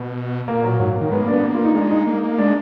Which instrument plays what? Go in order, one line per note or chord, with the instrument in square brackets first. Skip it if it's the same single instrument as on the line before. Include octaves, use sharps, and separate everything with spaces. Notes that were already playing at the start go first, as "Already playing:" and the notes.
Already playing: [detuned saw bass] B2
[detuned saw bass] A#2 [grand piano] A#3
[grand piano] F#3
[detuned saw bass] G#2 [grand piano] F#3
[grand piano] A#3
[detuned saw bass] D#3
[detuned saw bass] G#3 [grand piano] B3
[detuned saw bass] A#3
[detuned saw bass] B3 [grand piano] D4
[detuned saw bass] A#3
[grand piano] F4
D#4
[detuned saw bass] G#3 [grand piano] D4
[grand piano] D#4
[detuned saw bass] A#3
A#3
[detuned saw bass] G#3 [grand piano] D4